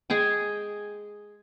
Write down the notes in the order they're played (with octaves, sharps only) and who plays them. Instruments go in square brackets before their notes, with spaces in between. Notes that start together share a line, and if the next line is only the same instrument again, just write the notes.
[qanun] G#3 G#4 G5 G#5